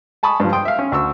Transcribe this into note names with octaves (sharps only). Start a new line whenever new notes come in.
G#5 A5 B5 C#6 D#6
G2 F3
G5 C6 D#6
E5 F5
C#4
D2 C#6 E6